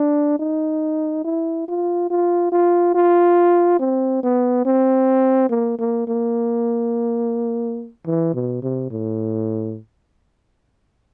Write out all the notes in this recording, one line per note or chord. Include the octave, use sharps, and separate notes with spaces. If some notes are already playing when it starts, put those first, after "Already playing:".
Already playing: D4
D#4
E4
F4
F4
F4
F4
C4
B3
C4
A#3
A#3
A#3
E3
B2
C3
A2